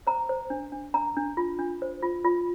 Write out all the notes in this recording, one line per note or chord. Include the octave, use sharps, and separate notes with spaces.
C5 A#5
C5
D4
D4
D4 A#5
D4
F4
D4
C5
F4
F4